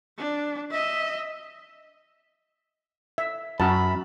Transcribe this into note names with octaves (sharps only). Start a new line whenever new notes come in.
D4
D#5 E5
E5
F#2 F#4 A5 B5